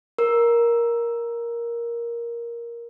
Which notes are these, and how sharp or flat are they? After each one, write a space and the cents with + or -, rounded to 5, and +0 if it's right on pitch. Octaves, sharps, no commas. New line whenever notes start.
A#4 +10